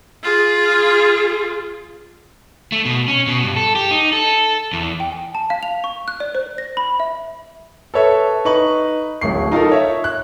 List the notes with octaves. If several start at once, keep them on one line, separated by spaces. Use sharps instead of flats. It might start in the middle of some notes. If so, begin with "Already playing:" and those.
F4 G#4
A3
B2
C#4
B2
G2
A4
G4
D#4
A4
E2
G5
G#5
A5
F5
F7
C#6
F#6
D5
C5
A#6
B5
E5
A4 B4 C#5 E5
D#4 B4 D#5 C#6 F#7
D1 A1 C#6 C7
D#4 F4 A4 A#4
C#5 E5
F#6